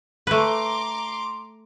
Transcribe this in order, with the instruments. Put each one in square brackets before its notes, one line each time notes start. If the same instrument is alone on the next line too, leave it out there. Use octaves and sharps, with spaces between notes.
[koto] A3 B4 [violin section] A#5 C6 D6